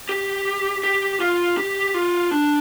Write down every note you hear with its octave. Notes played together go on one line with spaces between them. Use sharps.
G4
G4
F4
G4
F4
D4